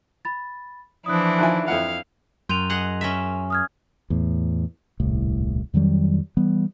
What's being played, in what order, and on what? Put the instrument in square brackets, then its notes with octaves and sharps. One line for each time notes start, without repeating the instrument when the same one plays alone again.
[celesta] B5 A6
[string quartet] E3 D4 E4 [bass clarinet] F3 [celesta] D#6 F#6
[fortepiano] D#3 F4 G#5 [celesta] E5 A#5 F#6
[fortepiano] F2 E4 F#5 [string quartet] F5
[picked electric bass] F#2 [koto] G5 [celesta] C6 D#7 F7
[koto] G#4 D#5 F#5
C#4 A#4 E5
[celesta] D#6 F6 G#6
[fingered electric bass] E2 A2
D#1 C2 A2
F2 D#3 F#3 G3
E3 G3 B3